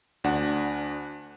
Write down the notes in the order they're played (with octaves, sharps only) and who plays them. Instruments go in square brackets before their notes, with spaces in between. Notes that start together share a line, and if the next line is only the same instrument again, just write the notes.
[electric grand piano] D2 D4 F#5